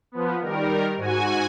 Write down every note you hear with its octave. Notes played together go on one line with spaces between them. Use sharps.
F3 B3
D#3 G3 A#4
G#2 F#4 G#5